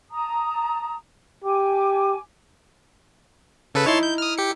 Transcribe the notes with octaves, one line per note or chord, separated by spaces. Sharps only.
A5 A#5 D#6
G4 G#5 D6
C#3 A4 B4
D#4 E4 C#5 A5 C6
G6
D#6 F6
G4 C#7